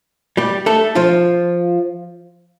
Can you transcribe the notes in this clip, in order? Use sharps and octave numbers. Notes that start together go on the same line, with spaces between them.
G3 G4
A3 A4
F3 F4